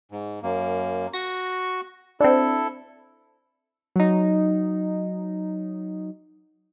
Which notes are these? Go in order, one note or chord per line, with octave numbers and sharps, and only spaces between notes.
G#2
F#2 A#3
F#4 C#6 A#6
C4 D4 E4 A4
F#3 D#4